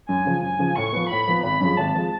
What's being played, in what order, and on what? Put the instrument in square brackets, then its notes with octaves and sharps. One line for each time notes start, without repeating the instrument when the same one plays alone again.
[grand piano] F#2 [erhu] G#5
[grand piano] C#3 F3
[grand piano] F#2 [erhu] G#5
[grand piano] C#3 F3
[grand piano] A2 [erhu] C#6
[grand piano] F3 B3
[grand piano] A2 [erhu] B5
[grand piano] F3 B3
[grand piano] G#1 [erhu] B5
[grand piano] F#2 F3 G#3
[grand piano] G#1 [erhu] A5
[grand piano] F3 G#3